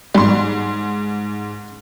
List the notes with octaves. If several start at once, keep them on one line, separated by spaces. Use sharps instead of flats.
G#2 G3 C6